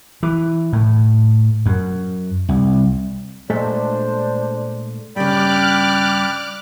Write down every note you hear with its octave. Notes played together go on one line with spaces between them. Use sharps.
E3
A2
F#2
C2
A#2 G#3 A3 D4 C5
G2 C#3 D5 G5 B5 D6 F6 F#6